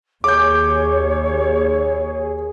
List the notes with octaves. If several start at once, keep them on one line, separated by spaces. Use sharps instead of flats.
D#2 G#4 C#5 D6 G6